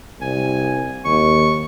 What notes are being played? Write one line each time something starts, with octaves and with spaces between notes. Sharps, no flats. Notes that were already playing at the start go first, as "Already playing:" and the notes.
C2 G#5
D#2 C#6